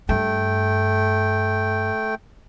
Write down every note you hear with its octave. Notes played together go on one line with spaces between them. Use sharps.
G2 A3 G5